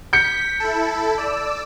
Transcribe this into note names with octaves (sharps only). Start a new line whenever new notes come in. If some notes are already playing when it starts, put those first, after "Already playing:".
G6 B6 C#7
E4 A4
D5 E6